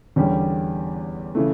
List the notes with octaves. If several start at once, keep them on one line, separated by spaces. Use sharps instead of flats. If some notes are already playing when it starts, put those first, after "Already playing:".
E2 D3 G3 C#4 G4
C#3 E3 A3